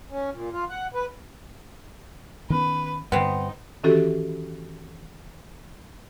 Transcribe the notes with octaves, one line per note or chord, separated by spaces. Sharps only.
C#4
A#2
F4
F#5
B4
D#3 B3 C#4 B4
G2 D3 B3 C4 D#4
D#3 E3 C#4 F#4 G4 A4